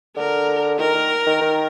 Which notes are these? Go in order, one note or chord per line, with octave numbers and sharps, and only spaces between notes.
D3 A#4
D#3 A#4
D#3
D#3
D#3